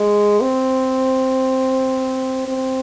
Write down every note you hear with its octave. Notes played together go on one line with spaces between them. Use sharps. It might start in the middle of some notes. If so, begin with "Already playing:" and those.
Already playing: G#3
C4
C4